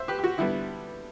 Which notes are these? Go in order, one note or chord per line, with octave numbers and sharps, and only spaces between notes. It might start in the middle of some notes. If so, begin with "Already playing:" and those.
Already playing: C5 E5
G4 B4
G4
F#4
D3 G3 B3 E4